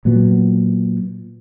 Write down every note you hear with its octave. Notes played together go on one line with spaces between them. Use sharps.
A#2 F#3 B3